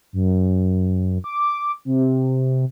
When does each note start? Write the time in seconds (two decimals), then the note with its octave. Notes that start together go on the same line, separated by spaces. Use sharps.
0.13 F#2
1.24 D6
1.85 C3